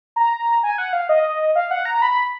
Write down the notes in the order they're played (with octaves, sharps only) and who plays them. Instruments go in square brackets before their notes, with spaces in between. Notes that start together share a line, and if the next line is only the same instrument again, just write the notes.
[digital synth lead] A#5
G#5
F#5
F5
D#5
F5
F#5
A#5
B5